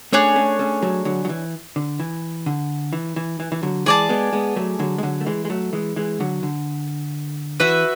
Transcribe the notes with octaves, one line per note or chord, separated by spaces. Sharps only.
A3 C#4 D4 G#4 C#5
A3 C#4
A3 C#4
F#3 A3
D3 F#3
F#3
E3
D3
E3
D3
E3
E3
E3
E3
D3 F#3
E3 G#3 G#4 D5 A5
G#3 B3
G#3 B3
F#3 A3
D3 F#3
G#3
D3 F#3
A3
E3 G#3
G#3
F#3 A3
E3 G#3
E3 G#3
D3 F#3
D3
E3 F#4 B4 E5